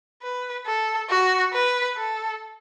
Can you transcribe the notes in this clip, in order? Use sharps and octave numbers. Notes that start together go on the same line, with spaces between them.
B4
A4
F#4
B4
A4